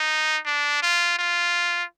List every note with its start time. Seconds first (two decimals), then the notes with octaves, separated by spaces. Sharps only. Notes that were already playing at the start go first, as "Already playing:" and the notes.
Already playing: D#4
0.46 D4
0.83 F4
1.19 F4